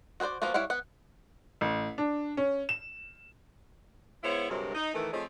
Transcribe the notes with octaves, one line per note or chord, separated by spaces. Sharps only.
F#4 G#4 B4 C5 D5
F3 A#3 B3 F4 F#4
G3 E4 C#5 F5 F#5
B3 F#5
A1
D4
C#4
E7
G#3 B3 E4 F4 C5 C#5
D2 G2 C3 F#3 G#3 A#4
D#4
D#3 E3 A3
F3 A3 C4 G#4 C#5 D#5